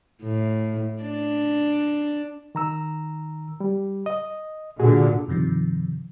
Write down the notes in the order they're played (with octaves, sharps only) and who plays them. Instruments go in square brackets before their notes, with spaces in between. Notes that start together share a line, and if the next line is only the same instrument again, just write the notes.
[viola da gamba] A2
D4
[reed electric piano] D#3 A#5 E6
G3
D#5
[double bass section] A#2 D3 [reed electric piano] F#4 G#4
[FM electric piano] G2 C3 D#3 F3